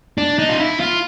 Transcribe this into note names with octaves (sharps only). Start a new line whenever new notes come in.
D4
D#4
F4
E4
F4